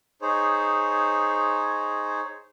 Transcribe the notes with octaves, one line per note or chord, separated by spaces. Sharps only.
D#4 G#4 C5 C#5